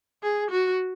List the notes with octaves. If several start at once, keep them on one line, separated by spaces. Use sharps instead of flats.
G#4
F#4